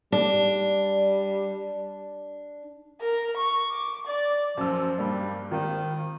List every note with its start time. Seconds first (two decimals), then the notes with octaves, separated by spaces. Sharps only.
0.12 G3 D4
3.01 A#4
3.37 C#6
3.71 D6
4.07 D5
4.57 F#2 F3 E6
4.98 G2 G3 A#3 D4
5.51 G#1 D#3 F4